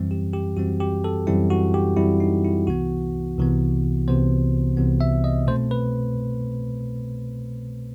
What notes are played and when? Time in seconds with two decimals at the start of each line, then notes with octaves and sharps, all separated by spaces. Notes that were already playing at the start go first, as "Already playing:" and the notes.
Already playing: F#2 E3 G3 C4
0.11 G4
0.33 G4
0.57 F#2 E3 G3 C4 F#4
0.80 G4
1.04 A4
1.27 F#2 E3 G3 C4 E4
1.50 F#4
1.74 G4
1.97 F#2 E3 G3 C4 E4
2.20 D#4
2.44 E4
2.67 C2 C3 E3 B3 F#4
3.38 C2 C3 E3 B3
4.08 C2 C3 E3 B3 C5
4.77 C2 C3 E3 B3
5.01 E5
5.24 D#5
5.47 B2 A3 C4 C5
5.71 B4